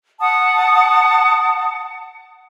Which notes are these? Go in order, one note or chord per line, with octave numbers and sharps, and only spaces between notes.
F#5 A5 D#6